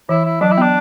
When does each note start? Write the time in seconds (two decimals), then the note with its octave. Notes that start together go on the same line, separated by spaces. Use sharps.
0.09 E3 E4
0.25 E4
0.41 F#3 D4
0.51 E4
0.58 B3
0.61 D4